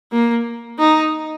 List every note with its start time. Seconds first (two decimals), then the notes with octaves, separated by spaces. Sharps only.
0.12 A#3
0.79 D#4